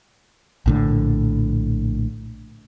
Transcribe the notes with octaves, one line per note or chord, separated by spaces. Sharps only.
A#1 A2 D3